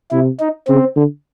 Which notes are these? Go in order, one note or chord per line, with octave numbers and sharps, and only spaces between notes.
C3 E4
D#4
C#3 C4
D3